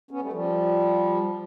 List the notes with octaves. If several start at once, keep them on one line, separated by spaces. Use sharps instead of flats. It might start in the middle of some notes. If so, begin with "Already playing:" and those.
B3 C#4
G3 A3
F3 G3